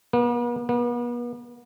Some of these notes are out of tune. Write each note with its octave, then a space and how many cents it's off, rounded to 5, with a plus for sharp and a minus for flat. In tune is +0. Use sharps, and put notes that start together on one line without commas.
B3 -45
B3 -40